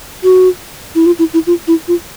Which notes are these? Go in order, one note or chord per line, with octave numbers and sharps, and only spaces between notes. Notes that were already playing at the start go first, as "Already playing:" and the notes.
F#4
E4
F4
E4
E4
F4
E4
F4